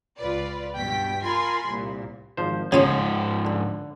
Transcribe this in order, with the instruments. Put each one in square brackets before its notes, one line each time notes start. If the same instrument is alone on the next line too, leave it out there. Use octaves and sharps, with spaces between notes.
[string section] C#2 F4 B4 D5
G2 B2 G5 B6
F4 A#4 G#5 B5 C6
C2 A#2
[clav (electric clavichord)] G#1 F3 C5
[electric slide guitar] G#2 F3 [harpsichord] C#3 F4 C#5 [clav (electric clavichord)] G#4
[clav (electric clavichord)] D3